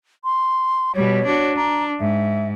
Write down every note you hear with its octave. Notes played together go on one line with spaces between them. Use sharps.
C6
B2 G3 C#5
D4 F#4
D4 A#5
G#2 E5